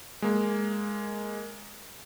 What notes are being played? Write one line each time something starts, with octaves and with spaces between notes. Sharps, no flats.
G#3 A#3